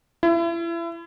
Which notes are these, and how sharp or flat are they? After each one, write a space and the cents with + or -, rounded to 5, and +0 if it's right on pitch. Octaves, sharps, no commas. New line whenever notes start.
E4 +35